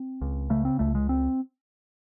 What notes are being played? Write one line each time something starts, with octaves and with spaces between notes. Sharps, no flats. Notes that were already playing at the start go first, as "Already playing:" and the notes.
Already playing: C4
C#2
C#3 A3
C4
C#2 A3
G#3
C4